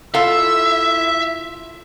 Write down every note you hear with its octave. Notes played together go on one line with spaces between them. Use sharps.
E4 F4 A4 E5 F5 E6